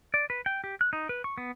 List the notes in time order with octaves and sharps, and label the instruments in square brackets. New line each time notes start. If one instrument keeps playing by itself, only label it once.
[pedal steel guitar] D5
B4
G5
G4
F#6
D#4
B4
C#6
B3